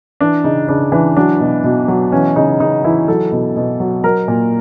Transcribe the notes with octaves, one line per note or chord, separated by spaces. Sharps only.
E3 D4
C#3 D#4
C#3 D4
E3 D4
F#3 D4
B2
B2
F#3
E3 C#4
C#3 D#4
C#3 D#4
E3 E4
F#3 A4
B2
B2
F#3
F#3 A#4
A#2